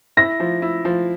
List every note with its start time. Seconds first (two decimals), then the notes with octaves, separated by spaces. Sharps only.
0.17 E4 A#6
0.40 F3
0.62 E4
0.85 F3